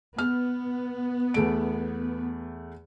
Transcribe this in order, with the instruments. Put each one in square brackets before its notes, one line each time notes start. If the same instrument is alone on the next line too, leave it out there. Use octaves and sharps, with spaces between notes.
[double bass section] B3 [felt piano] F6
[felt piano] E2 A3 D7